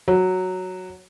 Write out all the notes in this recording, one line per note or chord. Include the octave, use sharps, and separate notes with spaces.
F#3